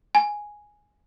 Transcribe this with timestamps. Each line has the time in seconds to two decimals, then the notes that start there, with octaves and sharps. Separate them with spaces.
0.15 G#5